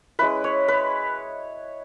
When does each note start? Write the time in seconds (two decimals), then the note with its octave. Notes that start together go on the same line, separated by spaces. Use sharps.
0.19 G#3 C#4 E4 B4
0.44 C#5
0.68 B4